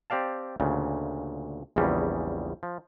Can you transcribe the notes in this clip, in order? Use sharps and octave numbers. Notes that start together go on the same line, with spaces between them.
C4 G4 D5 F5 A5
D2 A#2 C#3
A#1 E2 C#3 G3 G#3
F3